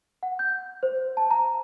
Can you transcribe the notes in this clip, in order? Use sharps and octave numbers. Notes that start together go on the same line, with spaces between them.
F#5
G6
C5
A5
A#5